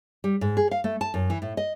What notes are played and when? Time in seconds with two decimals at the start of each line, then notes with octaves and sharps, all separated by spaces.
0.24 G3
0.41 G#2
0.57 G#4
0.71 F5
0.84 A3
1.01 A5
1.14 F#2
1.30 E3
1.42 A2
1.57 D#5